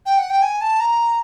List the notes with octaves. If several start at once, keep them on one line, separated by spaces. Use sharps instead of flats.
G5
F#5
G5
G#5
A5
A#5